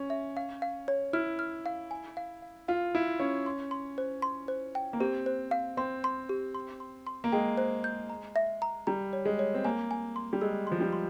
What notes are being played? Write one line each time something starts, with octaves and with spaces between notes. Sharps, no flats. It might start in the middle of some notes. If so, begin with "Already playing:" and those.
Already playing: C#4
E5
F5
F5
C#5
E4 F6
F6
F5
G#5
F5
F5
F4 F5
E4 F5
C#4 F5
C6
C6
C5
C6
C5
G5
A#3
C4 G4
C5
F5
C4 C6
C6
G4
C6
C6
C6
A#3
G#3 G5
C5
G6
A#5
E5
A#5
G3 A#5
C#5
G#3
C#5
C4
A#3 G#5
G#5
C6
G3
G#3 E6
F3 C6
G3
C6